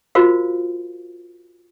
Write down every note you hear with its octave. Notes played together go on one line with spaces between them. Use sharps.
F4 F#4 A#4 C5 F5